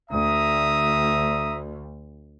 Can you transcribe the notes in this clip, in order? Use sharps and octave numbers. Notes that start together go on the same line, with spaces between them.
D2 E5 A#5 D#6